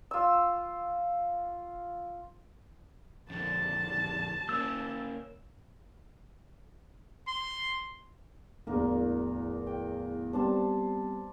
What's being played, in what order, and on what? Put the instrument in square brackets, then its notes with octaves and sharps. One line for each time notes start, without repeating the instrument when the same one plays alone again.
[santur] F4 E6
[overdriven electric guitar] F2 D3 [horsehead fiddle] A5
[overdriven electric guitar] A#3 C#4 [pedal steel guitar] E6
[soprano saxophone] C6
[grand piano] D1 E2 D4 [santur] A#3 A#4
[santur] G5
[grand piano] G3 B3 C4 [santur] D4 C5 A5